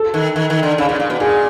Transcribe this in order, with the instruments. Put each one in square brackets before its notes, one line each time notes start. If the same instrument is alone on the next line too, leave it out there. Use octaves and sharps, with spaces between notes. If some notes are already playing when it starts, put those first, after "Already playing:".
Already playing: [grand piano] A4
[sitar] D#3
D#3
D#3
D3
C#3
A#2
A#2
B2
[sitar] A#2 [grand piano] G#4